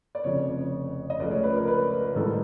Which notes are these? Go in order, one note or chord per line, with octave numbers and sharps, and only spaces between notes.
D5
F1 F2 C#3 F3 C#5
D#5
C#2 C#3 F3 A3 D5
C#5
B4
A#4
B4
A1 G#2 D#3 G3 A4